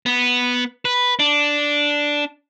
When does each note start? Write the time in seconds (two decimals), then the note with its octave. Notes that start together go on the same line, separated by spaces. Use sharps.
0.06 B3
0.85 B4
1.19 D4